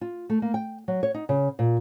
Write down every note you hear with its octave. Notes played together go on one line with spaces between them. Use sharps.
F4
A3
A#3
G5
F#3
C#5
D#4
C#3
A#2